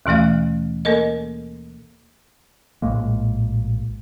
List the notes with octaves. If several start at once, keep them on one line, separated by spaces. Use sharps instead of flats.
D#2 B2 E3 A3 F5
A#3 A4 A#4 D#5
A#1 A2 G#3 A#3